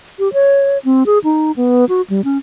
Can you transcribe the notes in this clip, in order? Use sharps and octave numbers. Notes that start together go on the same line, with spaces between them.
G4
C#5
C4
G#4
D#4
B3
F#4
G3
C#4